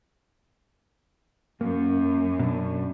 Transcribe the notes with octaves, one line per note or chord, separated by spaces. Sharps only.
F#2 A#3
B2 D4